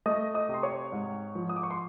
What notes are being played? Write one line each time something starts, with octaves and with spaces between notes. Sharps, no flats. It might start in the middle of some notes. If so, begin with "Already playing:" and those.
A3 D#5 D#6
D#5 D#6
C3
C6
C#5 C#6
G#2
F3
D#6
D6
C#6
C6